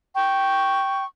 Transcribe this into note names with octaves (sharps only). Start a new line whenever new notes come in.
G5 C#6